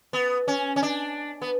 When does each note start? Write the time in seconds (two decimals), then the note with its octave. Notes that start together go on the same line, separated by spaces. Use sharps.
0.13 B3
0.48 C#4
0.76 C#4
0.83 D4
1.42 B3